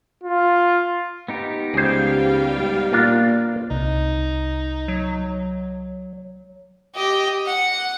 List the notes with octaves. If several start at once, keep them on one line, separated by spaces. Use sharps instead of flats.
F4
B3 D#4 G4
C#2 G3 G#4 C5 F5 G5
A#2 D4 F4 A#4
C2 D#4
F#3
G4 D#5
F#5